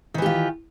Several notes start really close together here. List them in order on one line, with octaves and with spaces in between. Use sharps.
D#3 E3 G4 F4